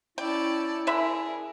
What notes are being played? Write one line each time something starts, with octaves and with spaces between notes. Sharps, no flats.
C#4 E4 D5 G5 A5
D3 G#4 A#4 E5 B5